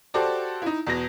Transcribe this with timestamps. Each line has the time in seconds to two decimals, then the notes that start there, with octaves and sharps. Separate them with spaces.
0.14 F#4 G4 A4 C5 D5
0.62 D#4 E4
0.87 E2 B2 A#6